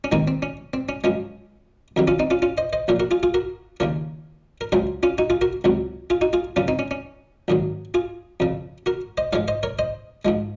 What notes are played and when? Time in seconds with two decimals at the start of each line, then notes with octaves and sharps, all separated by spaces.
0.04 C#4
0.12 D#2 D#3 G#3 C4 D#4
0.28 C4
0.42 C#4
0.74 C4
0.89 C#4
1.04 F#2 F3 G#3 C#4
1.96 F2 C3 D#3 F#3
2.08 C#4 F4
2.19 C4 D#4
2.30 C#4 F4
2.42 C#4 F4
2.58 C5 D#5
2.73 C5 D#5
2.88 A#1 A#2 F3 A#4 C#5
3.00 F#4 A#4
3.11 F4 G#4
3.23 F4 G#4
3.34 F#4 A#4
3.80 D#2 C#3 F3 A#4 C#5
4.61 A#4
4.72 C#2 C#3 F#3 G#4 C5
5.03 C#4 F4
5.18 D#4 F#4
5.30 F4 G#4
5.41 F#4 A#4
5.64 C#2 C3 F#3
6.10 F4 G#4
6.21 D#4 F#4
6.33 F4 G#4
6.56 F#2 C#3 F3 C#4 F4
6.68 C4 D#4
6.79 C#4
6.91 C#4
7.48 A#1 G#2 D#3 F#3
7.94 F4 G#4
8.40 F2 C#3 F3
8.86 F#4 A#4
9.18 C5 D#5
9.33 G#2 F3 G#3 C#5 F5
9.48 C5 D#5
9.63 A#4 C#5
9.79 C5 D#5
10.25 G#2 F3 G#3